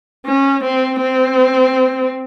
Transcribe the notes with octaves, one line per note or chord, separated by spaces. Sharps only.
C#4
C4
C4